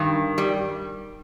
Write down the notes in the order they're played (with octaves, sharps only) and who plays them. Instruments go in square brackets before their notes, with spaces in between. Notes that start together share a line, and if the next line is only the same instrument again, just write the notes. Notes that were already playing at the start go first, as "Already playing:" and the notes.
Already playing: [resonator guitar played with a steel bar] G2 D#3
G3